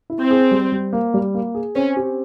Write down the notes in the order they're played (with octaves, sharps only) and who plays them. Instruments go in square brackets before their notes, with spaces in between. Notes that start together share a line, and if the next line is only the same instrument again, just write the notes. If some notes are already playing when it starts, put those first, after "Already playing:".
[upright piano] E4
[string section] C4
[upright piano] G#4
G3
G3
A#3
G3
A#3
G#4
[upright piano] C4 [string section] C#4
[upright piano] G4